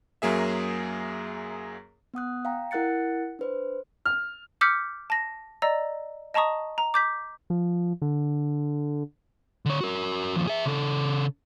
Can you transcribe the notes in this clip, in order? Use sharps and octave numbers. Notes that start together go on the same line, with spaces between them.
F#2 F#3 A#3 G#4 E5
B3 F#5 D#6 F#6
F5 G5 A#5
E4 A#4 F#5 F#6 A6 C#7
D4 B4 C5
F6
D6 E6 F6 G6 B6 C#7
A5 A#6
D5 D#5 A#5 E6
D#5 A5 A#5 C#6 D#6
A#5
D6 G6 B6
F3
D3
D3 C#5
F#4 A#4
D#2 F3
G#4 E5
C#3 A4